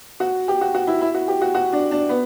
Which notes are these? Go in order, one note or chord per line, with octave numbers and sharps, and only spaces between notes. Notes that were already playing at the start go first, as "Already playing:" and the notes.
F#4
G4
F#4
F#4
E4
E4
F#4
G4
F#4
F#4
D4
D4
B3